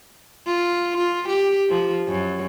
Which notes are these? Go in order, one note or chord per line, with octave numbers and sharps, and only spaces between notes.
F4
F4
G4
F3
F#2